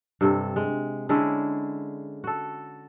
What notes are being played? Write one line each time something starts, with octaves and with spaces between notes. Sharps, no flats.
G2 C3 A4
G#3
D3 G#3 C#4 E4
F#4 A4